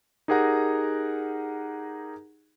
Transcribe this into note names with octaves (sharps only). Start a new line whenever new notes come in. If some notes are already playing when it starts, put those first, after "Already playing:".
D#4 G4 G#4 A#4 F#5 A#5